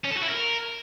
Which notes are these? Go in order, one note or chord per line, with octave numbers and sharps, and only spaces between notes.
C#4
A4
F#4
E4
A#4